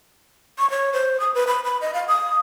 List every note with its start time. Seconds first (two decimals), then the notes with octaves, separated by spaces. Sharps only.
0.59 C#6
0.70 C#5
0.93 C5
1.20 D#6
1.34 B4
1.47 B5
1.64 B5
1.81 D#5
1.94 F5
2.08 D#6